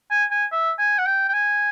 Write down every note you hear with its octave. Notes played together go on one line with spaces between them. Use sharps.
G#5
G#5
E5
G#5
F#5
G5
G5
G#5